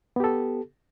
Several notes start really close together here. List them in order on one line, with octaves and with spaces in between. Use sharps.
B3 G4 A4